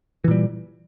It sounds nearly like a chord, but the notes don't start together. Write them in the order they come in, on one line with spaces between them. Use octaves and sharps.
E3 A#2 G3